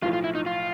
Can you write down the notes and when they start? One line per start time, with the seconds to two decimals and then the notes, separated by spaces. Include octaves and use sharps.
0.02 B1 A2 F3 F4
0.13 F4
0.24 E4
0.35 D#4
0.46 F4